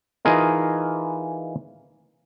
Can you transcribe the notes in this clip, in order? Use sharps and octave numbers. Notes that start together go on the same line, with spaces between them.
E3 D#4 F4 G#4 A#4 D#5